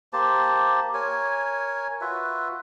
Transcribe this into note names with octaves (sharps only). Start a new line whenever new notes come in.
A#3 G4 C5 A5
A#4 C#5 G#5
F4 F#4 B4 E5